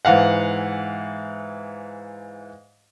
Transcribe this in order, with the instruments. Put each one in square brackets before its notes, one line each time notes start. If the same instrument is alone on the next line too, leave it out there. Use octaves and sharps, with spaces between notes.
[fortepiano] G#2 E3 F5 F#5